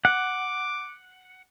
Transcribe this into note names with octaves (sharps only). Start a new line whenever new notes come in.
F#5 D6